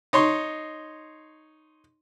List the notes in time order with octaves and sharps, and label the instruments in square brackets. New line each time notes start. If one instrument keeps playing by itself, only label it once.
[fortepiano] D#4 C#5 C6